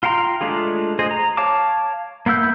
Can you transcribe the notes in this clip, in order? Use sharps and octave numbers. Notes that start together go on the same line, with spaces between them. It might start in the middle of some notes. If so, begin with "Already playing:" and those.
F4 F5 G5 A#5 C6
G#3 A3 D4 F4 G#4
G#4 C5 D#5
A#5
C#5 F5 A5 D6
A#3 B3 E4 E6 G6